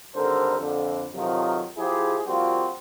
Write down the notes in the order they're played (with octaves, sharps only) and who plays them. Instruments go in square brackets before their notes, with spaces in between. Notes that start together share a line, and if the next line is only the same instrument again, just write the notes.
[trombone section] G#1 D3 G3 A4 A#4 C5
F2 D3
F2 C3 D#3 F3 F#3
F3 E4 G4 G#4
F3 G3 A#3 C4 F4 F#4